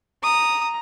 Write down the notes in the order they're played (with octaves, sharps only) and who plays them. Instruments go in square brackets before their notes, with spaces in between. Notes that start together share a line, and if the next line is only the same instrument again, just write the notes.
[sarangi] A#5 [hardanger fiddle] D#6